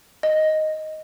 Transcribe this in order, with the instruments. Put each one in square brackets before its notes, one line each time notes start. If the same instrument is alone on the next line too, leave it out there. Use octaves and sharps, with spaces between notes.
[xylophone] D#5